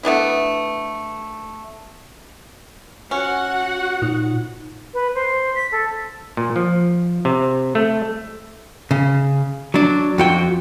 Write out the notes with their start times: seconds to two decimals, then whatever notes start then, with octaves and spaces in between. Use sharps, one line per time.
0.03 A3 B3 D4 E4
3.11 C#4 F#4 F#5
4.02 A#2 D#4
4.93 B4
5.15 C5
5.55 B6
5.72 A4
6.37 A#2
6.56 F3
7.25 C3
7.75 A3
8.91 C#3
9.74 F#3 D4
10.18 F2 F#4 G5